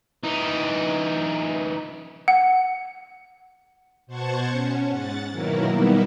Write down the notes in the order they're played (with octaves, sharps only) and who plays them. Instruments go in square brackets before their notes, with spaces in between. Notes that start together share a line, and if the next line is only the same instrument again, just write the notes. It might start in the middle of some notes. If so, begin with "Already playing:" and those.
[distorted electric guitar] E3 D#4
[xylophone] F#5
[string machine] B2 C5 F#5 A5 C#6 G#6
C#4
G#2 F#5 A6
B2 D#3 F#3 A#3 E4 A#4
G3 A#3 B3 D#4 E4